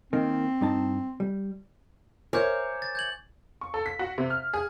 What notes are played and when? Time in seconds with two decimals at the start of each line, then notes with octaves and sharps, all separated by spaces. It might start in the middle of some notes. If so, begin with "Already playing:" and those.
0.13 D#3 A#3 C4
0.61 G2 D#4 A5
1.20 G3
2.33 A#4 C5 C#5 E5 G#5 D6 G6
2.82 A6
2.95 G6 G#6 F#7
3.61 C#6
3.74 A4
3.86 B6
3.99 F#4
4.18 C3
4.30 F6
4.53 G#4